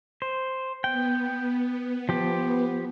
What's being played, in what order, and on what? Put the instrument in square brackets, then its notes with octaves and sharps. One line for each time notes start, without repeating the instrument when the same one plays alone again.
[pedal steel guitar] C5
[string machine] B3 [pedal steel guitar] G5
[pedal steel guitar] F3 G4